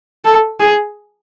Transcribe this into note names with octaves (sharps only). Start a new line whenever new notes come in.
A4
G#4